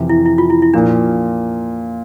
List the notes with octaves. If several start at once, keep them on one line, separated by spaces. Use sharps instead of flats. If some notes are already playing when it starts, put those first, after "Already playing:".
Already playing: F2 C3 E3
E4
E4
F4
E4
E4
A#2 F3 A#3 D4